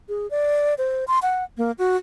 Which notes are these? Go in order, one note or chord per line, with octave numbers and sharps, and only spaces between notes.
G#4
D5
C5
C6
F#5
A#3
F#4